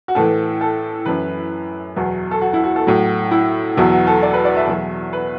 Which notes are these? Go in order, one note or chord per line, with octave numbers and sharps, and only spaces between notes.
F#4
A2 E3 A4
A4
F#2 E3 B4
E2 B2 F#3
A4
F#4
E4
F#4
A4
A2 F#3 F#4
E4
E2 B2 F#3 E4
F#4
A4
D5
B4
D5
E5
E2 B2 F#3
B4